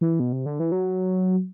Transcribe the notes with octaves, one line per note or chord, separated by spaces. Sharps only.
E3
B2
C3
D3
E3
F#3